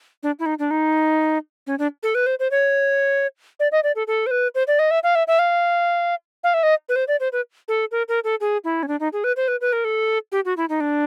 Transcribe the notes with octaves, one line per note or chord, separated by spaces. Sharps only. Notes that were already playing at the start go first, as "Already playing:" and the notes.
D4
E4
D#4
D4
D#4
C#4
D4
A4
B4
C5
C5
C#5
D5
D#5
D5
A4
A4
C5
B4
C5
D5
D#5
E5
F5
E5
E5
F5
F5
E5
D#5
B4
C5
D5
C5
B4
A4
A#4
A#4
A4
G#4
E4
C#4
D4
D#4
G#4
B4
C5
B4
B4
A#4
A4
G4
F#4
E4
D#4
D4